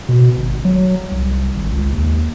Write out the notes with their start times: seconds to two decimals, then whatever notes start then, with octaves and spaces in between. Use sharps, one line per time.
0.09 B2
0.37 G#1
0.65 F#3
1.12 C2
1.55 G#1
1.72 C#2
1.92 D#2